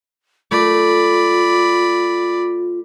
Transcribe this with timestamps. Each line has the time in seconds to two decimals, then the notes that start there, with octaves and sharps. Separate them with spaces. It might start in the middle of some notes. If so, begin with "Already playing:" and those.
0.51 A3 F4 D5 B5